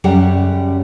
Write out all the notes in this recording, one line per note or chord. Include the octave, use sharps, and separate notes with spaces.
F#2 C#3 G3 G4 G#4 F#5